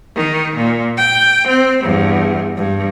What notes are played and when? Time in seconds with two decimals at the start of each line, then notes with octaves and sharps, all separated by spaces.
0.16 D#3
0.56 A#2
0.97 G5
1.48 C4
1.82 E2 G2
2.57 G2